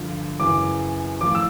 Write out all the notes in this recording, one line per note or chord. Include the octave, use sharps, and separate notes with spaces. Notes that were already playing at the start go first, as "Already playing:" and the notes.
Already playing: G2 D3 F3
F#2 C#3 E3 D6
A2 F3 D6
E6